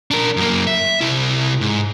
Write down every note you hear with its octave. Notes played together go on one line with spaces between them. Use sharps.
D4 A#4
F#2 A#3
E5
C3 E4
G#2